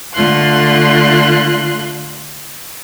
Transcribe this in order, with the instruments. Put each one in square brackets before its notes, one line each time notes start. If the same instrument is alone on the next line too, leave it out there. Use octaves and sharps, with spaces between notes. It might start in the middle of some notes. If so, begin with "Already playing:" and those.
[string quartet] D3 A3 F4 C6 F#6